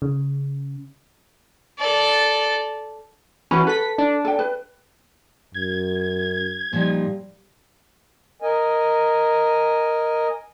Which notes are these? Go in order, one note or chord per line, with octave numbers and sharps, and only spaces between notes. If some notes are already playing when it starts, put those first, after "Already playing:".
C#3
A4 D5
E3 C#4 F#4 B5
A4 B4 B6
D4
A4 G5
B4
F#2 G#6
A#2 F3 G3 D#4
A#4 D#5 G#5